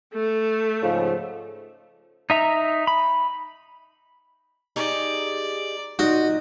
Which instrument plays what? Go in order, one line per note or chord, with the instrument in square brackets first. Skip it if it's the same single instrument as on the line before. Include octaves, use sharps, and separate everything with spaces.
[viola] A3
[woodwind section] G#2 C#3 F3
[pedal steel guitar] D#4 E5 A#5
B5
[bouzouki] D#4 G4 G#4 [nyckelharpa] D5
[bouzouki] A#2 D#5 [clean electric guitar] D#4 [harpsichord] F#4